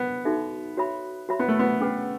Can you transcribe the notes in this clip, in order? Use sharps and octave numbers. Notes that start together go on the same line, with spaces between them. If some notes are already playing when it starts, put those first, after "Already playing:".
Already playing: B3
D#4 F#4 A4 E5
F#4 C#5 E5 B5
F#4 C#5 E5 B5
B3
A3
B3
C#4 G#4 B4 F#5